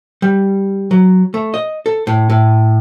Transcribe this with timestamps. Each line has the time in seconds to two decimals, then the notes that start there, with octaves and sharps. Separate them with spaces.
0.22 G3
0.91 F#3
1.34 A3
1.54 D#5
1.86 A4
2.07 A2
2.30 A2